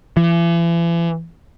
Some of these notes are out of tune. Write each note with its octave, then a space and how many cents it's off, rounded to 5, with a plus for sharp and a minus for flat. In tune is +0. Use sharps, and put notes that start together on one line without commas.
E3 +40